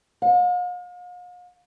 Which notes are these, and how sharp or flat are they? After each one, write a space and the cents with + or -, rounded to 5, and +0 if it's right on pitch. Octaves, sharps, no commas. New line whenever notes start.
F5 +45